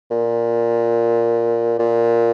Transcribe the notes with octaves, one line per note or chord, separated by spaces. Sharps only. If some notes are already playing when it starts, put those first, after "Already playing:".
A#2
A#2